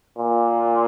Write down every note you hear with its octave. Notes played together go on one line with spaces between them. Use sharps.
A#2